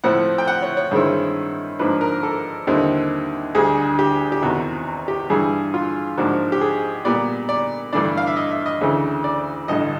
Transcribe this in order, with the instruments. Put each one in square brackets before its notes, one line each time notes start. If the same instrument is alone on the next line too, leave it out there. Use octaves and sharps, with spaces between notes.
[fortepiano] A2 F3 A3 C4 E4 F#5
G5
F#5
C#5
C#5
G2 D#3 G#3 C4 E4
G#2 F3 A#3 D4 B4
A#4
A4
D#2 D3 G3 C4 E4
D2 D3 G3 G#4
G4
G4
E2 C3 D#3 F#4
G4
G2 E3 G3 G#4
F4
G#2 F3 A#3 D4 F#4
G4
G#4
A#2 G3 B3 D5
D5
G2 E3 A3 D4 D5
F5
E5
D#5
E5
D#5
D2 C#3 E3 A3
D5
A1 G2 D3 D#5